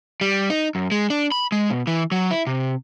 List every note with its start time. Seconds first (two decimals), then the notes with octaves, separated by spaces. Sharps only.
0.21 G3
0.50 D#4
0.75 F#2
0.91 G#3
1.10 D4
1.32 B5
1.52 G#3
1.70 B2
1.87 E3
2.12 F#3
2.31 E4
2.47 C3